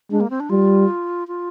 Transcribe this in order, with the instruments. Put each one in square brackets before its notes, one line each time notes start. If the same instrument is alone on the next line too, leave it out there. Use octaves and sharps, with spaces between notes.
[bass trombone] G#3 [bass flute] D4
[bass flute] A#3
C4
D4
[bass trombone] G3 [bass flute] F4
[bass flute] F4